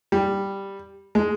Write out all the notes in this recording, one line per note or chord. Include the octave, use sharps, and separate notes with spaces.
G3
G#3